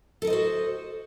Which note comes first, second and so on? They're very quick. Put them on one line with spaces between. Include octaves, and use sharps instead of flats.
A4 A#4 D#5 C5 F#4